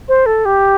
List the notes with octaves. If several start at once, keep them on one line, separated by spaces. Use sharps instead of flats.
C5
A4
G4